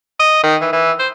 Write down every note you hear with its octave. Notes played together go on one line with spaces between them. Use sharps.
D#5
D#3
E3
E3
C5